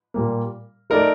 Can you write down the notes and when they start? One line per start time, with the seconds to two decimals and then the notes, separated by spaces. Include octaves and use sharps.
0.14 A#2 G3 A#3
0.90 A3 D#4 A4 A#4 D5